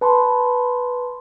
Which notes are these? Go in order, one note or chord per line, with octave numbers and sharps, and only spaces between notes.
B4 A5 B5 C6